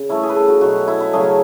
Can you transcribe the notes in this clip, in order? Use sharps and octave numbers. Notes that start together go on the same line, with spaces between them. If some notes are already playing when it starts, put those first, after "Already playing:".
Already playing: C#3
E3 A3 C#4 E4
G#4
B4
A4
F#4
B2 F#3 C#4 F#4
E4
E4
C#3 F#3 A3 C#4 G#4